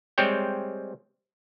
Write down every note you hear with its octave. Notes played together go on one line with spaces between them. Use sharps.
G3 G#3 C4 C5 C#5 G5